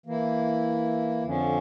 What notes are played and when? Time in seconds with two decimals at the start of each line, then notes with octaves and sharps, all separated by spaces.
0.06 E3 A#3 E4
1.24 F2 D3 F3 C#4